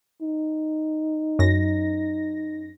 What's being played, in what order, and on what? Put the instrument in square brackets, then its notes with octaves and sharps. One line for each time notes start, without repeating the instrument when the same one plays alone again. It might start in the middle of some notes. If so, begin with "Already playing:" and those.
[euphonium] D#4
[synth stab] F#2 A#6